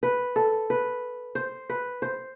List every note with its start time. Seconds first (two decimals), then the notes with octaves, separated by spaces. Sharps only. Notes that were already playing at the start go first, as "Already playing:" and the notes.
0.03 B4
0.36 A4
0.70 B4
1.35 C5
1.70 B4
2.02 C5